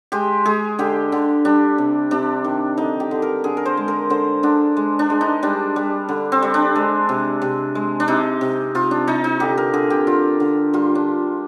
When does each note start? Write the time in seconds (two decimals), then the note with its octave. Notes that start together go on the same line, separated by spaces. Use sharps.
0.12 G#3 G4
0.45 G#3 G#4
0.79 D3 G4
1.12 D3
1.45 G3 D4
1.78 C3
2.11 C3 D4
2.44 D#3
2.78 D3 D#4
3.00 G4
3.11 D3
3.22 A#4
3.44 D3 G#4
3.57 A#4
3.65 C5
3.77 G#3
3.88 A#4
4.10 D3 C5
4.43 D3 D4
4.77 G#3
4.99 D4
5.10 G#3
5.21 D#4
5.43 G3 D4
5.76 G3
6.09 D3
6.32 C4
6.43 G3
6.54 D4
6.76 G#3
7.09 C3
7.42 C3
7.75 G#3
8.00 D4
8.08 C3 D#4
8.41 C3
8.75 C3 F4
8.91 D4
9.07 C3 D#4
9.24 D#4
9.40 D3 G4
9.58 A#4
9.74 D3 G#4
9.90 G4
10.07 D3 F4
10.40 D3
10.73 G3 F4
10.95 D4